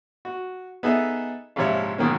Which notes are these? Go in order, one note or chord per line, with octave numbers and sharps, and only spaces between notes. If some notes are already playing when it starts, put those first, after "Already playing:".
F#4
B3 D#4 G#4 A4 D#5 E5
A#1 G#2 C3 F3 C#5 E5
G#2 B2 D#3 F#3 A#3 C#4